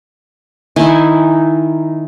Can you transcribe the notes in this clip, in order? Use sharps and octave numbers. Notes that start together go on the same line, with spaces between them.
D#3 D#4 E4 G#5